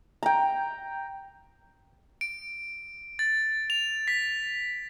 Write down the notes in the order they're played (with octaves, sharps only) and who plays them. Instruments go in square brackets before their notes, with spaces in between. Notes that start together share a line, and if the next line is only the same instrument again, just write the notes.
[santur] G5 A#5
[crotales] D7
A6
F7
B6